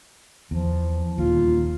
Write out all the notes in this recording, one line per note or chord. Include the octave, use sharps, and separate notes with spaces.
E2 F3
D#1 D#2 F4